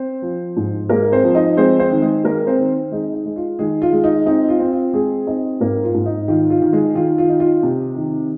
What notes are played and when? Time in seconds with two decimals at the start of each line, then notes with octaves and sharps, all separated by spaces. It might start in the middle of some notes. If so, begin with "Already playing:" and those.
Already playing: C4 C5
0.22 F3
0.57 G#2
0.89 G#3 A#3 A#4
1.12 C4 C5
1.24 F3
1.35 D#4 D#5
1.57 G#3 C4 C5
1.79 C4 C5
1.91 D#3
2.02 G#3 G#4
2.24 G#3 A#3 A#4
2.47 C4 C5
2.59 D#3
2.92 G#3 D#4
3.14 D#4
3.26 G#3
3.36 F4
3.59 D#3 G#3 G#4
3.82 F4
3.93 G#3
4.04 D#4
4.26 C4 D#4
4.49 F4
4.60 C4
4.71 F4
4.94 G#3 C4 G#4
5.27 C4 D#4 D#5
5.60 G#2 A#3 A#4
5.83 F4
5.94 G#2
6.06 D#4
6.28 D#3 F4
6.50 F4
6.62 D#3
6.73 G#3 G#4
6.95 D#3 F4
7.18 F4
7.29 D#4
7.40 F4
7.63 C3
7.96 D#3